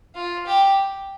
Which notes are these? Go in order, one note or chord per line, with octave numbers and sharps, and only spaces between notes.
F4
G4